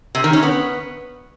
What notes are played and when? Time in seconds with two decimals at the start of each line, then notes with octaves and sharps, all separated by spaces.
0.15 C3
0.24 D#3
0.33 C#4
0.43 B3